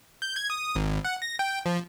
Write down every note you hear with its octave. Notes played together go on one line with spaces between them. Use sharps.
G6
G#6
D#6
G#1
F#5
A#6
G5
F3